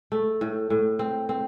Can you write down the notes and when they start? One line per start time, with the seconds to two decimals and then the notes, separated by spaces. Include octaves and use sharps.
0.12 A3
0.41 A2
0.70 A2
0.99 C4
1.29 C4